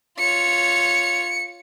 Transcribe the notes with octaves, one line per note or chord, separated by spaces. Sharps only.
F4 C#5 C#7